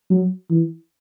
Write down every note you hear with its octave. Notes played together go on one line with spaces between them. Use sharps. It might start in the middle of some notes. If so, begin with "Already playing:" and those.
F#3
E3